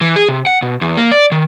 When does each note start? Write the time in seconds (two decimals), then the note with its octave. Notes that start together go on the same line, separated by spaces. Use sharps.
0.01 E3
0.16 G#4
0.29 C3
0.46 F#5
0.62 B2
0.81 E2
0.97 A#3
1.12 D5
1.32 D#3